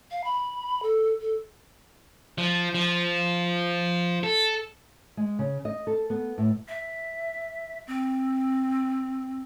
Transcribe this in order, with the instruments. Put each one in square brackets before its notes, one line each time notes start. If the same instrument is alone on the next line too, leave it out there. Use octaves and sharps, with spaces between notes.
[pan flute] F5
B5
A4
A4
[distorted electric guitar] F3
F3
A4
[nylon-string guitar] G#3
C#3
D#5
A4
B3
A2
[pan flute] E5
C4